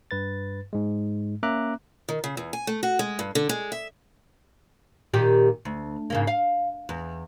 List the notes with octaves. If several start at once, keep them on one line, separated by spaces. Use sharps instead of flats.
G2 B4 A6
G#2 G#3
A#3 C#4 E5 A#5 D6 F#6
D#3
C#3
E2
G#5
A3
F#4
G#3
G2
D3
G#3
E5
A#2 D#3 G4
D2
G#2 C#3 A#3
F5
E2